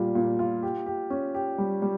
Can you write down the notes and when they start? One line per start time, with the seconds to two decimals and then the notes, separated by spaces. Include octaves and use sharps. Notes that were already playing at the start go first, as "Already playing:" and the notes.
Already playing: A#2 G3 F4
0.15 A#2
0.39 F4
0.63 G4
0.86 G4
1.10 C#4
1.34 G4
1.58 G3
1.82 G3